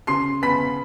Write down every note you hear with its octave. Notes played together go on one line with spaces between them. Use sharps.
C#3 C6 C7
B3 B5 B6